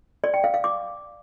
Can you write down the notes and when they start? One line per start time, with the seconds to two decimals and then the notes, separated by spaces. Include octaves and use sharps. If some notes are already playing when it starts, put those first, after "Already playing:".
0.24 D5
0.34 G5
0.44 F5
0.54 F5
0.64 D6